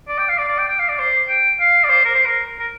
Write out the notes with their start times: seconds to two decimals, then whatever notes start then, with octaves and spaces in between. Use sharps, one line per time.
0.08 D5
0.18 G5
0.29 F5
0.38 D5
0.48 D5
0.58 G5
0.69 G5
0.79 F5
0.89 D5
0.99 C5
1.29 G5
1.60 F5
1.83 D5
1.89 C5
2.05 A#4
2.15 C5
2.25 A#4
2.60 A#4